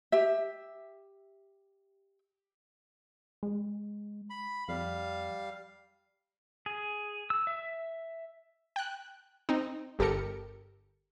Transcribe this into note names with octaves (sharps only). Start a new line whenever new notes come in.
G4 E5
G#3
B5
F2 G3 F5
G#4
E6
E5
G5 F#6
C4 D#4
G1 G4 A4 A#4 C#7